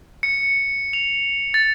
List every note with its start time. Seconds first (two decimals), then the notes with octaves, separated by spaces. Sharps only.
0.23 C#7
0.93 F7
1.54 A6